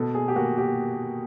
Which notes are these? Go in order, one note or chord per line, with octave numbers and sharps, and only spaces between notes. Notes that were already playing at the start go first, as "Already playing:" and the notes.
Already playing: B2 A4
G#4
G4
A#3 F#4
G4